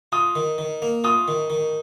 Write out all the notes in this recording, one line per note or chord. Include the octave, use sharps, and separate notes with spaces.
F4 D#6
D#3
D#3
A#3
F4 D#6
D#3
D#3